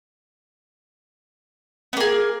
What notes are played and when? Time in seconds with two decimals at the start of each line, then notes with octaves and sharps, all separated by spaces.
1.93 B3
1.97 A#3
2.00 G#4